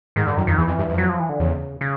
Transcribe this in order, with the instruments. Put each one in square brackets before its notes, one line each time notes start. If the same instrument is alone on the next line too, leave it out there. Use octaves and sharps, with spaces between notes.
[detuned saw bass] G#2 [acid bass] D#3
[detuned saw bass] G2 [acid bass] D3
[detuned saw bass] F#2 [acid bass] D#3
[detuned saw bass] F2 [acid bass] D#3
[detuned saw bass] E2 [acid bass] E3
[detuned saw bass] F2
G2
F2
[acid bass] F#3
F3
E3
D3
[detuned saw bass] E2 [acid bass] C#3
[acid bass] C#3